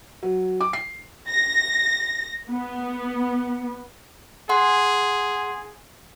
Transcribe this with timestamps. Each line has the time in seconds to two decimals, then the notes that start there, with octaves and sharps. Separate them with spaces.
0.23 F#3
0.61 D6
0.73 C7
1.28 A#6
2.49 B3
4.49 G#4 F#5 C6